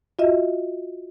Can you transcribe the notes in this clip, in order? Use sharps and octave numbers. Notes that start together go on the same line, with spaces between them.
F4 F#4 D#5 E5